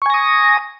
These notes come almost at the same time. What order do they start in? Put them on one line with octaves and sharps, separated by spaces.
C#6 G#5 A#6 D#6